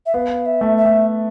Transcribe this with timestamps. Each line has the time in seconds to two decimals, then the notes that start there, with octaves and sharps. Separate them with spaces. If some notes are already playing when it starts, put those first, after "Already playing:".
0.06 E5
0.14 B3 F5
0.46 E5
0.61 A3
0.77 E5
0.85 A3